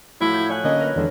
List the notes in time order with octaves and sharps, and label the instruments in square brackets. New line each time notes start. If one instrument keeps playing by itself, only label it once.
[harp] A2 F3 F#3 [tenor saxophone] E4
[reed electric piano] G6 G#6
[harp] C#5 G#5 F#6
[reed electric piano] D3 A#3 C#4 [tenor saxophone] D#5
[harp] A#4 B4
[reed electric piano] E2 D#3 G#3 [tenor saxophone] D3